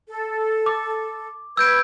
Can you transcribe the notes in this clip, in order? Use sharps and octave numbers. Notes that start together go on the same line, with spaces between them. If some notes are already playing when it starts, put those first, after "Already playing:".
A4
D6
B4 E6 G6 G#6 D7